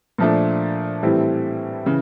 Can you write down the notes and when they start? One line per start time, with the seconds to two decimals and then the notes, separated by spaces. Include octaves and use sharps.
0.18 A#2 F3 A3 D4
1.03 A2 E3 G3 C4 E4
1.86 C#3 E3